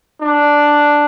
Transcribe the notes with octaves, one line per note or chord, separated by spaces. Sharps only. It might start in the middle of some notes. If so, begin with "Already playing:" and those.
D4